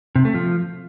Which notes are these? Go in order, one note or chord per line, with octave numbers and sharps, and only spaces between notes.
C3
A3
F3